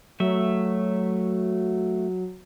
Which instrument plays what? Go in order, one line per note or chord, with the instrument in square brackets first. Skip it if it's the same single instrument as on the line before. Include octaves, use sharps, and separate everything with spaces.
[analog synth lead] F#3 [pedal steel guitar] A3 E5